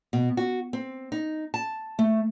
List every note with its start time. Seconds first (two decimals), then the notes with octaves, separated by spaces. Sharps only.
0.13 B2
0.37 F#4
0.73 C4
1.12 D#4
1.54 A5
1.99 A3